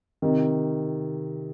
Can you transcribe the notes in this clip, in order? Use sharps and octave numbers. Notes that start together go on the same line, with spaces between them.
C3 D#3